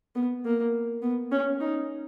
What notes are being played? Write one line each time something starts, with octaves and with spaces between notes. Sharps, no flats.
B3
A#3
B3
C#4
D#4